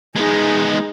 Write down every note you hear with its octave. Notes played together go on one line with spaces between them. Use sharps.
G#3 B3 D#4 G#4